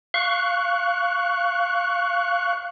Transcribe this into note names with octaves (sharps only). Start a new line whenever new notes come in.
F5 C#6 F#6